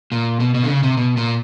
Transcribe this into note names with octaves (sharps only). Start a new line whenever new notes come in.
A#2
B2
B2
D3
C#3
C3
B2
A#2